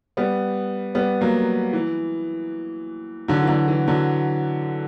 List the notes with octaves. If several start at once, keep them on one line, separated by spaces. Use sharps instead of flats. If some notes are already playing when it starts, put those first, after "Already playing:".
G3 B3
G3 B3
F#3 A#3
E3
D3 F#3
E3
D3 F#3
E3
D3 F#3